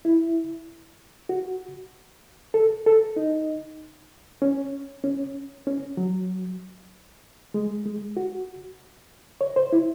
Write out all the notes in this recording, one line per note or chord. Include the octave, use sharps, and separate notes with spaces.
E4
F#4
A4
A4
D#4
C#4
C#4
C#4
F#3
G#3
G#3
F#4
C#5
C5
E4